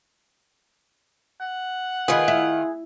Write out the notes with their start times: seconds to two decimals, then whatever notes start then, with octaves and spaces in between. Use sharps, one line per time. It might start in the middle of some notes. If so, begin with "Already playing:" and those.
1.41 F#5
2.08 D#3 F4 G#4 B4
2.28 E4